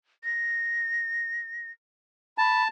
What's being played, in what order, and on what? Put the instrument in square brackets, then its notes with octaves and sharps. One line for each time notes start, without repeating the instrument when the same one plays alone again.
[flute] A#6
[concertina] A5 [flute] B5